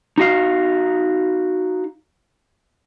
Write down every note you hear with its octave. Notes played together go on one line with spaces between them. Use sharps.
D#4 F#4 F5